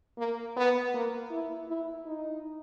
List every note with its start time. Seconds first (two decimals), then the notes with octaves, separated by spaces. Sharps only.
0.18 A#3
0.57 B3
0.94 A#3
1.31 E4
1.68 E4
2.06 D#4